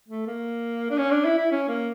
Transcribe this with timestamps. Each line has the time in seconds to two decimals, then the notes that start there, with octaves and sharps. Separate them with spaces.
0.09 A3
0.27 A#3
0.90 D4
0.98 C#4
1.11 D4
1.25 E4
1.38 E4
1.52 C#4
1.69 A#3